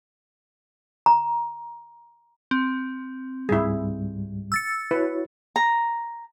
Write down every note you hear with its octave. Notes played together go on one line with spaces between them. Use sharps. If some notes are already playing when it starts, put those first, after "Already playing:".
A#5
C4
C#2 G#2 G3 E4 G#4
E6 A6 C#7
E4 F#4 B4 C#5
A#5